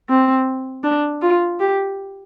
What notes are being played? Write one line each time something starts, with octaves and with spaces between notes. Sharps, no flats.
C4
D4
F4
G4